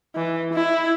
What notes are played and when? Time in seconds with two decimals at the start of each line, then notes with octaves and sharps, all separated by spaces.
0.15 E3
0.54 E4